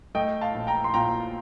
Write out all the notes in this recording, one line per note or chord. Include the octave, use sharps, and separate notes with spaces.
A3 D#5 G5
F5 A5
A#1
G5 A#5
C6
A#2 G5 A#5